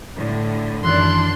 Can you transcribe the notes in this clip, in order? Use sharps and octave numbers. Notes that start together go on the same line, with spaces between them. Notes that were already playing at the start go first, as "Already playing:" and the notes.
A2 D3
F#2 D#3 E3 D4 C6 F#6